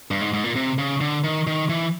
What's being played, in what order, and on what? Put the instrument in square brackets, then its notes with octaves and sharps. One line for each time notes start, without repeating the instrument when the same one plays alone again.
[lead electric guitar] G2
G#2
G#2
A#2
C3
C#3
D3
D#3
D#3
E3